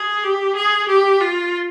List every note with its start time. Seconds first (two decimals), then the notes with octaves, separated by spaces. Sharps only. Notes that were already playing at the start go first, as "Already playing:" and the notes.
Already playing: G#4
0.24 G4
0.56 G#4
0.88 G4
1.21 F4